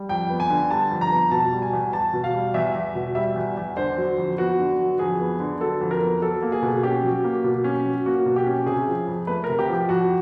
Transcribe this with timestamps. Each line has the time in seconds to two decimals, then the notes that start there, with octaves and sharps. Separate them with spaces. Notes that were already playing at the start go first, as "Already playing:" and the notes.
Already playing: G3
0.09 F2 G5
0.30 B3
0.40 G#5
0.50 D3
0.71 G3 A5
0.91 F2
1.01 A#5
1.11 B3
1.31 B2 A5
1.53 G3
1.62 G#5
1.73 E2
1.93 E2 A5
2.13 B2
2.24 F5
2.34 G3
2.54 E2 E5
2.75 E2
2.95 B2
3.15 G3 E5
3.35 E2
3.57 E2
3.77 D3 C5
3.97 F#3
4.18 F2
4.38 B3 F#4
4.59 D3
4.79 F#3
4.99 F2 G#4
5.20 B3
5.40 D3
5.60 F#3 A4
5.81 F2
5.91 A#4
6.02 B3
6.22 F#3 A4
6.42 A#3
6.52 G#4
6.62 B2
6.83 C#4 G4
7.03 F#3
7.24 A#3
7.44 B2
7.64 C#4
7.85 F#3
8.06 A#3 F#4
8.26 B2
8.36 G4
8.46 C#4
8.66 C3 G#4
8.87 F3
9.07 F2
9.27 A3 B4
9.44 C3 A#4
9.59 G4
9.69 F3 G4
9.89 F2 F#4